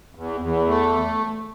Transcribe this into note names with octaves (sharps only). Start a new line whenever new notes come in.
E2
E2
A3